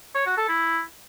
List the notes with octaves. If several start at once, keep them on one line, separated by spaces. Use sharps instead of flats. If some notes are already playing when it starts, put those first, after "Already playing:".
C#5
F#4
A4
E4